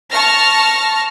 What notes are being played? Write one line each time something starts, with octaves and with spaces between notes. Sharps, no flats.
A5 C#6 F6 A#6